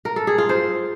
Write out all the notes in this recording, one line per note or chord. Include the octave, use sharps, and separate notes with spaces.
A#4
A4
G#4
F4
C5